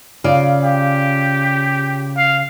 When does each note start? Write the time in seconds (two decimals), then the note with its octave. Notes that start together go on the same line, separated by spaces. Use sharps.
0.24 C#3 F4 D5
0.64 G4
2.17 F5